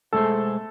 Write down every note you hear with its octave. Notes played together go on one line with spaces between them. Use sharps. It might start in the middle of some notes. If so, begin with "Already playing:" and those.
B2 G#3 A3 D4 G#4 A4 C5